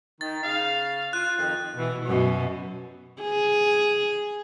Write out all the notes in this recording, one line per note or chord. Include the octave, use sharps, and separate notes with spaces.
D#3 A6
C#3 F5
F4 F#6
F2 D#3 F3
B2 E3
F#2 B2
G#4